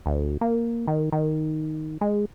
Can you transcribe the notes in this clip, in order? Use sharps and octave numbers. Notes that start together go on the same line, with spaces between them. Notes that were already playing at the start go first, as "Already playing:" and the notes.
D2
A#3
D#3
D#3
G#3